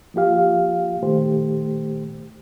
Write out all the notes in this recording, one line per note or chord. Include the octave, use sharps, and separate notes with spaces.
F3 A#3 F4 G4 F5
A#2 D#3 A3 G4 C5